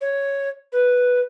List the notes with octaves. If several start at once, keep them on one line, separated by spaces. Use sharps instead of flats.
C#5
B4